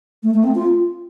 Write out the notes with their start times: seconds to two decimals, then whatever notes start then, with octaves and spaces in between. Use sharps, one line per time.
0.23 A3
0.34 A3
0.44 C4
0.55 F4